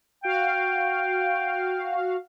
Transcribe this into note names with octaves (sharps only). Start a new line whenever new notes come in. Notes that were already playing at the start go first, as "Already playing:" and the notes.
F#4 F5 G5